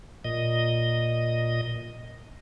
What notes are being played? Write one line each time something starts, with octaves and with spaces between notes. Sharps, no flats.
A#2 D#5